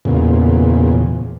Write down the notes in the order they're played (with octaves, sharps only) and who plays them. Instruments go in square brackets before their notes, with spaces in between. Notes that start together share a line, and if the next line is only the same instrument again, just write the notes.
[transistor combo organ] E2 A#2 C#3